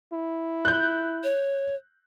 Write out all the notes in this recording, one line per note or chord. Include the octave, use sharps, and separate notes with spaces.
E4
F#6 G6
C#5